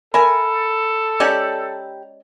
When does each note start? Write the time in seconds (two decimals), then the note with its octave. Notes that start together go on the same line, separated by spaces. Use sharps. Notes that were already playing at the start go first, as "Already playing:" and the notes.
0.14 A4 A#4 E5 G#5 B5
1.20 G#3 C#4 G4 D5 A#5